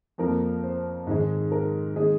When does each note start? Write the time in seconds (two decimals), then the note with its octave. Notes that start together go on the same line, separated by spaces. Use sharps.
0.18 F2 F3 A#3 A#4
0.63 C5
1.07 G#2 D#3 G#3
1.52 A#4
1.96 D#3 G#3 D#4 G#4